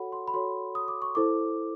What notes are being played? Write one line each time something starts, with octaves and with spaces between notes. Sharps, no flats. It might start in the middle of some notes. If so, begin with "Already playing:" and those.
Already playing: F#4 A4 C#5 F#5 B5
C6
B5
F#4 A4 C#5 C6
D#6
D6
C#6
E4 A4 C5 D6